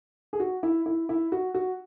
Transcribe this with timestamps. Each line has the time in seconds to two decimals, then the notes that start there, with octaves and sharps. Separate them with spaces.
0.33 G#4
0.40 F#4
0.63 E4
0.86 E4
1.09 E4
1.32 F#4
1.54 F#4